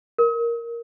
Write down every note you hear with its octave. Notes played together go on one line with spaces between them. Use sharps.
A#4